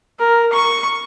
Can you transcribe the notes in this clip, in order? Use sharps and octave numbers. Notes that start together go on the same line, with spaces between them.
A#4
C#6